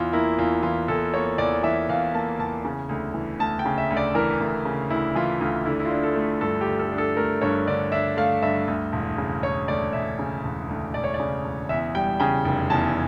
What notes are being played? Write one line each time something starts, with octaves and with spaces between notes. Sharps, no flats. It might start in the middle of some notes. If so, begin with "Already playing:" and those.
Already playing: E2 E3 F4
A#3 E4
E2 F4
E3 F4
E2 A4
A#3 C#5
E2 D5
E3 E5
E2 F5
A#3 A5
E2 A5
C#3
D2
E3
D2 A5
G5
C#3
E5
D2
D5
E3 A#4
D2
C#3
D2 E4
E3 F4
D2 F4
D3 E4
E4
F4
D4
A4
A3
G2 A4
G4
D3
A4
D4
A4
A3 A#4
G2 C#5
D3 D5
D4 E5
A3 F5
G2 E5
D2
E1
C#3
E1 C#5
D2 D5
E1 E5
C#3
E1
D2
E1 D5
C#5
D5
C#3
E1
E2 E5
G3 G5
C#3 G5
F1 G5
E2 A5